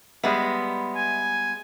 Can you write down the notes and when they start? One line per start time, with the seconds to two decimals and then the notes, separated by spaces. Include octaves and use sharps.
0.24 G3 G#3 B3 E5
0.97 G#5